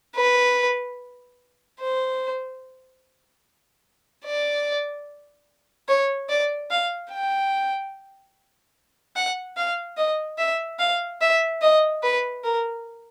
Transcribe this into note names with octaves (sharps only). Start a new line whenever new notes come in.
B4
C5
D5
C#5
D5
F5
G5
F#5
F5
D#5
E5
F5
E5
D#5
B4
A#4